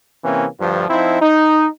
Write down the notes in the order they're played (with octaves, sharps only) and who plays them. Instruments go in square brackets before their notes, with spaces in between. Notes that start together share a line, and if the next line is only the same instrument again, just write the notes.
[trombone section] C3 E3 A#3 C4 C#4
D2 G2 F3
F3 C4 D#4 E4
D#4